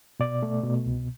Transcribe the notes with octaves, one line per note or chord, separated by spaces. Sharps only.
B2 D5
A3
B2
C2